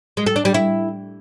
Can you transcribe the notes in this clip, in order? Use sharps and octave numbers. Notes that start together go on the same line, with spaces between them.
G#3
A4
D4
G3
E4